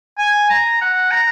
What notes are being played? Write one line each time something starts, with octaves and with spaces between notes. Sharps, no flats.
G#5
A#5
F#5
A#5